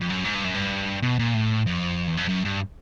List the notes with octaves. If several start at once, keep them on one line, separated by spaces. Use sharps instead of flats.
F2
F#2
G#2
G2
F#2
G2
B2
A#2
A2
F2
E2
F2
F#2
G2